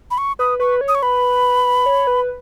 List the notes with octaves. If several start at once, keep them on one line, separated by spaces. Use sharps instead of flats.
B5
C#6
B4 D#6
B4 C#6
C#5
D#6
C#6
B4 B5
C#5
B4